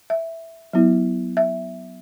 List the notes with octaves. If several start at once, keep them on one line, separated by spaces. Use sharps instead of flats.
E5
F#3 B3 E4
E5